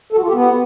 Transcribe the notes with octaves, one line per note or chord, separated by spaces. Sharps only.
A4
F#4
F4
G4
B3